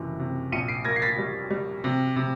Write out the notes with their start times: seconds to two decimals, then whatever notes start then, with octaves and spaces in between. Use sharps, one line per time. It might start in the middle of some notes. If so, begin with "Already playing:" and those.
Already playing: F#1 C3 E3
0.19 C3
0.52 A#1 C#7 D#7
0.68 C7 D7
0.85 A#3 G#6 A#6
0.96 C7
1.02 A6 B6
1.18 G3
1.51 G3
1.84 C3
2.16 C3